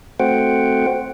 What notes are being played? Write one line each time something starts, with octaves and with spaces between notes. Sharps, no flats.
A3 C4 F#4 C5 F#5 G5